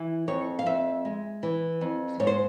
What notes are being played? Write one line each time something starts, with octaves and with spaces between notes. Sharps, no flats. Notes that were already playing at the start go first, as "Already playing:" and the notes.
Already playing: E3
F2 C#5
F5
F2 E5
G#3
E3
F2
G#2 C#5
C5